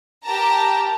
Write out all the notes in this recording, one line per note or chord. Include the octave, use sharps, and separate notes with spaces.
G4 A#4 A5 A#5